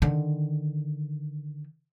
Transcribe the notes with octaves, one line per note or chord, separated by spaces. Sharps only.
D3 D#3